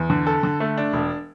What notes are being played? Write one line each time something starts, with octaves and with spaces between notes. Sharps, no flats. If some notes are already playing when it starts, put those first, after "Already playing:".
Already playing: E2
D3
A4
D3
A3
D4
E1